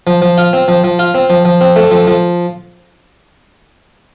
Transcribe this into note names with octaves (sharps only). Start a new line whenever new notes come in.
F3
F3
F4
C4
F3
F3
F4
C4
F3
F3
C4
A3
F3
F3